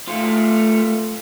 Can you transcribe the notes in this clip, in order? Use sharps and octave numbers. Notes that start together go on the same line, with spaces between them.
A3 F4